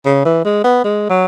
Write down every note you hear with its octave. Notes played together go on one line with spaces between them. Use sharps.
C#3
E3
G#3
B3
G#3
F#3